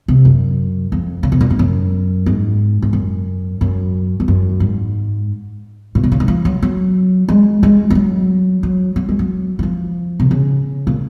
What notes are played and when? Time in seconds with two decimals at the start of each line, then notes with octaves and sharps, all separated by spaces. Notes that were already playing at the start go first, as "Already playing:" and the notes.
0.08 C3
0.25 F#2
0.92 F2
1.23 C#3
1.32 C3
1.41 A#2
1.50 G#2
1.59 F#2
2.26 G#2
2.82 G#2
2.93 F#2
3.61 F#2
4.20 F2
4.28 F#2
4.60 G#2
5.95 A#2
6.04 C3
6.12 C#3
6.20 D#3
6.28 F3
6.45 F#3
6.63 F#3
7.29 G#3
7.63 G#3
7.90 G#3
7.95 F#3
8.63 F#3
8.96 F#3
9.09 G#3
9.19 F#3
9.59 F#3
9.63 F3
10.20 C3
10.31 C#3
10.87 A#2